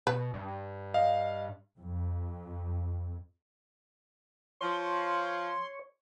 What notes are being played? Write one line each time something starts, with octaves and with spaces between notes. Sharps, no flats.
B2 B4
G2
D#5 F5
F2
F3 C#5 C6